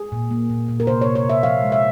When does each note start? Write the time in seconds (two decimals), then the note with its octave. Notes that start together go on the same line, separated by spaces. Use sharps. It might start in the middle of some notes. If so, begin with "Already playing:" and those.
Already playing: G#4
0.12 A#2
0.31 A#3
0.50 A#2
0.68 A#2
0.80 A#4
0.87 C3 C5
1.01 C3 C#5
1.15 C#5
1.25 C3 E5
1.43 F3 F5
1.62 G#3
1.72 E5